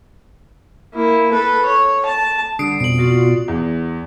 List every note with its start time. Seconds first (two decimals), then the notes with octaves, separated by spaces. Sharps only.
0.94 A#3 E4
1.32 A4 B4
1.66 C#5
2.05 A5
2.59 D3 G3 D#6 C7 D7
2.80 F2 B2 D7 F#7
2.98 F4 F#4 D5
3.48 E2